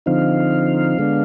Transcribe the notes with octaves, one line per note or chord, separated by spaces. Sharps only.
D3 F3 C4 D#4 F5
D3 G#3 B3 D4